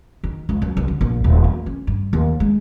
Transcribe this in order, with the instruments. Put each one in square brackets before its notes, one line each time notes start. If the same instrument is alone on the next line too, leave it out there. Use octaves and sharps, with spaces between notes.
[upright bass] D#3
C#2
F#2
C2
D3
A#1
D#1
A#3
C#4
G2
D#2
G#3